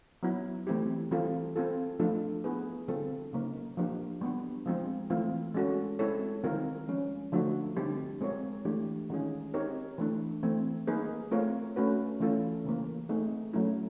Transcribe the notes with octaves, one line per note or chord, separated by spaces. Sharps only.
F#3 B3 E4
E3 A3 C4 E4 G4
E3 G3 C4 F4 A4
C4 F4 A4
F3 A3 D4 F4 A4
B3 E4 G#4 B4
D3 G3 C4 F4 A4
C#3 F#3 A#3 D#4
F3 A#3 D4 G4
G3 B3 D4
F3 G#3 C4 F4
E3 A3 C4 F4
G#3 C#4 F#4 A4
G#3 C4 E4 A4 C#5
D#3 G3 C4 F4 A#4
F3 G#3 C#4
D3 F3 A3 D4 F#4
D3 G3 C4 D#4 G4
G#3 C4 F4 A#4 C#5
E3 A3 D4 G4
D#3 G#3 C#4 F4 G#4
C4 D#4 G4 A#4 C#5
E3 A3 D4
E3 A3 C4
G3 A#3 D#4 G#4 B4
A3 C4 F4 A#4 C#5
A3 C#4 F#4 B4
E3 A3 C#4 F4 A4
C#3 E3 G3 A#3
A3 C4 D#4 G#4
F#3 A3 C#4 E4